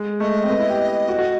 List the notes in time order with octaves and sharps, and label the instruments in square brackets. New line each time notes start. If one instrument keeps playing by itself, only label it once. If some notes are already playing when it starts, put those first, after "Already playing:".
Already playing: [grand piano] G#3
[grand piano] A3 [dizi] D#5
[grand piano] C4
B3
E4
G4
F#4
F#4